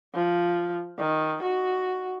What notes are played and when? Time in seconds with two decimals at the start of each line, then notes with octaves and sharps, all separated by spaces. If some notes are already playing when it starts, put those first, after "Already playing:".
0.14 F3
0.98 D#3
1.42 F#4